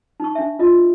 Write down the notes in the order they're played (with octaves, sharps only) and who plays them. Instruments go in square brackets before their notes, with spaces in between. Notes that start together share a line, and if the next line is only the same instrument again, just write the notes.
[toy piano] D#4 C#6
D4 E5
F4 D#5